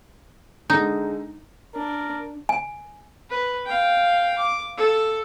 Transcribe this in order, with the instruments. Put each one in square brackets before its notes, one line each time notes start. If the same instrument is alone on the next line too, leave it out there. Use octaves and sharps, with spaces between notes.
[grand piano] D3 G#3 [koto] D#4
[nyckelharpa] D4 [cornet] A#4
[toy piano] G#5
[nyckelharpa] B4
F5 G5
D6
A4